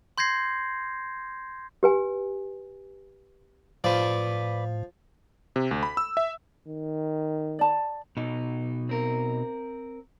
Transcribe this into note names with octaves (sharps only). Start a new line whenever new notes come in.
C6 G6 G#6 A#6 C7
G4 B4 G#5
A2 F3 B4 D5
C3
D2
B5
E6
E5
D#3
D5 A5
B2 D#4
C4 A#4